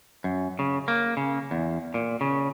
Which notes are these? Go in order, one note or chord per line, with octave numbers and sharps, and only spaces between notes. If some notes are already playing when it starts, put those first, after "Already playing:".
F#2
C#3
A#3
C#3
E2
A#2
C#3